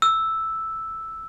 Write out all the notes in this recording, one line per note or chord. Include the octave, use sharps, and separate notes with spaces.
E6